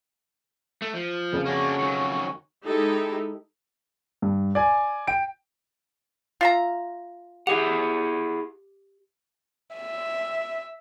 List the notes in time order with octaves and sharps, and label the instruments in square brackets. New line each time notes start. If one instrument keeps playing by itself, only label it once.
[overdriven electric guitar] A3
F3
[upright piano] F2 C#3
[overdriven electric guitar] A#3 D4 [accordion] C#4 F#4 C#6
[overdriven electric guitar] D#3 F#3
[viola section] G#3 D#4 E4 G4 A4
[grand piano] G2
D5 G#5
G5 D7
[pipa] F4 E5 A#5
[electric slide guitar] E4 G#4 F#5 [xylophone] G4
[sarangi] E5